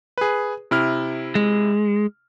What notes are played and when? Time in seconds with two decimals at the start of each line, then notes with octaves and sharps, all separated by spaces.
0.18 G#4 B4
0.71 C3 E4 F6
1.35 G#3